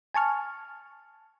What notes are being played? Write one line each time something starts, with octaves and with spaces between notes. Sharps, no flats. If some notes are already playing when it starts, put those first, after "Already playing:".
G#5 A5 C#6 F6